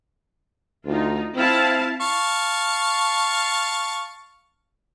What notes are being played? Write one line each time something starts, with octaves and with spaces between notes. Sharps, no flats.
D2 D#4 F4
C4 E4 F5 A5
F5 A5 C#6